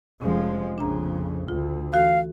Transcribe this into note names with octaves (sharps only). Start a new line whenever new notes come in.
F1 F3 G#3 C#4
A#1 F2 C#3 D4 F4 A#5
D2 F4
E3 F#4 A4 F5